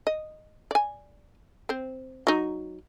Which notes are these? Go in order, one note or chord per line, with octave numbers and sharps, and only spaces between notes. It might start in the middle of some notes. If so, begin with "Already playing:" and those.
D#5
D5 G#5
C4 C5
F#3 D#4